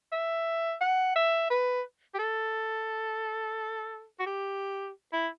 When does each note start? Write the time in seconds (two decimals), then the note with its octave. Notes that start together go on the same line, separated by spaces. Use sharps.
0.12 E5
0.81 F#5
1.16 E5
1.50 B4
2.14 G4
2.19 A4
4.19 F#4
4.26 G4
5.13 E4